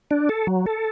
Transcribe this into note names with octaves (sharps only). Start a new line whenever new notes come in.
D4
A4
F#3
A4